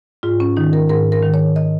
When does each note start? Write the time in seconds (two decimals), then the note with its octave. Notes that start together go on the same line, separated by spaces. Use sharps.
0.23 G#2 F4
0.40 C#4
0.57 D#3 D#4
0.73 A#4
0.90 G#2 A#4
1.12 A#4
1.23 D#3
1.34 C#5
1.56 D#5